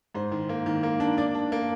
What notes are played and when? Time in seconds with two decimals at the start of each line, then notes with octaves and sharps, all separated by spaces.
0.15 G#2 C5
0.32 D#3
0.49 A#3
0.66 D#3
0.83 A#3
1.00 D4
1.18 D4 D5
1.34 D4
1.52 A#3